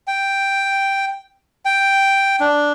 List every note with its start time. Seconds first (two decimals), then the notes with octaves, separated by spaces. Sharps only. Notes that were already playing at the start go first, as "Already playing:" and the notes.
0.07 G5
1.65 G5
2.40 D4